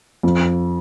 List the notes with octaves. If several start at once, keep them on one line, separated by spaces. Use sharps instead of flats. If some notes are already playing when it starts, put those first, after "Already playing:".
F2